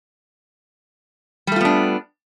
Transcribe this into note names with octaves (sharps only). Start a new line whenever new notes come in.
G3 A3 B3 D4 F4